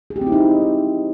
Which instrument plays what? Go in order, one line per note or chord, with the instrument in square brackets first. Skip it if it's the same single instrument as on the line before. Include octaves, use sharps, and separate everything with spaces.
[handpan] G#4
G4
C4
E4
D#4